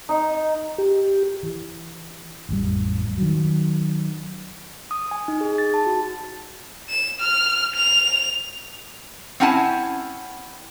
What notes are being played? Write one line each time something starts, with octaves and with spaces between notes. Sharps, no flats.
D#4
G4
E3
A1 F2 G3
D#3 F#3
D#6
G#5
D#4
G#4
A6
A5
F#4
E7
F6
F7
C4 C#4 E4 F#5 G#5 A5